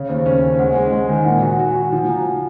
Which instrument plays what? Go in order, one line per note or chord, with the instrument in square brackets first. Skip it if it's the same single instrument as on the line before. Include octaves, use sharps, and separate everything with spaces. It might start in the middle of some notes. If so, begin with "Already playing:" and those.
Already playing: [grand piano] C#3 [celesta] C#5
[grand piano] D#2 [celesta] C5
[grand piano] C#4 [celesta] C5
[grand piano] C#4
[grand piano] G#3 [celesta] F#5
[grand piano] G#3 [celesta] G#5
[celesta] F#5
[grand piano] G#3
[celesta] G#5
[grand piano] D#3
[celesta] F#5
[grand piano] A#2 [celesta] G#5
[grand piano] F#4 [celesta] F#5
[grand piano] F#4 [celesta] G#5
[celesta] F#5
[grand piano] F#4
[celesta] F#5
[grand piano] F3 [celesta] G#5
[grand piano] F3 [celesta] A#5
[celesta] F#5